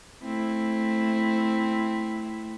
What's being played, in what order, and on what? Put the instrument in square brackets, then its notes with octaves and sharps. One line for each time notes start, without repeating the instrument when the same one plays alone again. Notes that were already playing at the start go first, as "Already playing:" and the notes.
[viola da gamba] A3 C4 E4